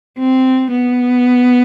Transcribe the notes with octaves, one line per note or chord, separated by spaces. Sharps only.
C4
B3